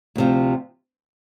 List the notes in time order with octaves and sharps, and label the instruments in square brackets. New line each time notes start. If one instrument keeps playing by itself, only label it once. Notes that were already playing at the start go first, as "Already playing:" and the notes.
[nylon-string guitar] D2 C3 F3